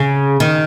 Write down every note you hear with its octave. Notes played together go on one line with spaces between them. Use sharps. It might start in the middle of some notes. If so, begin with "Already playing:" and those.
Already playing: C#3
D#3